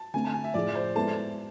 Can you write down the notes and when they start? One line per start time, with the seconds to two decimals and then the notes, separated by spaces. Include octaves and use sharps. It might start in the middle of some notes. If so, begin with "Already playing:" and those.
Already playing: A5
0.14 D3 A3 C4 G#5
0.24 A5
0.34 G#5
0.44 E5
0.54 A2 F3 A3 E4 G#4 D5
0.75 C5
0.95 G#3 B3 E4 A4 A5